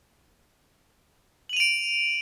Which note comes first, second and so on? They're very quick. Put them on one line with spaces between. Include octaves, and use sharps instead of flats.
F#7 D#7 F7 D7